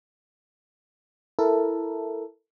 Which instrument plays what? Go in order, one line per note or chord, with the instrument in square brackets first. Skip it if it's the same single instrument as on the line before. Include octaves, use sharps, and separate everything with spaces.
[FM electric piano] E4 A4 A#4